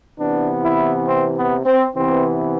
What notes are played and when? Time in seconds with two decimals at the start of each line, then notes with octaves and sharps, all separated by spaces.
0.19 C3 E3 B3 D4
0.63 E4
1.07 C4
1.36 B3
1.66 C4
1.95 C3 E3 B3 C4